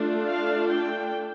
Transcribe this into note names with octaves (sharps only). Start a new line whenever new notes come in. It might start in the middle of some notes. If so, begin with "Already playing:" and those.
Already playing: A3 D4 F4
F5
G5